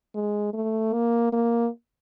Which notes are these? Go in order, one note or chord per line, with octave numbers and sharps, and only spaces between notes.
G#3
A3
A#3
A#3